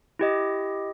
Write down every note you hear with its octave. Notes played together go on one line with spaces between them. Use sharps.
E4 G4 D#5